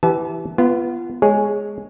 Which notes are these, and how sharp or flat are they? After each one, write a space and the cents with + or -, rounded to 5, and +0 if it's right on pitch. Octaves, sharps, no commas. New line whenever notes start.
E3 +0 G4 -15 A5 -40
B3 +0 F4 -30
G#3 +0 G#4 +0 C#5 +0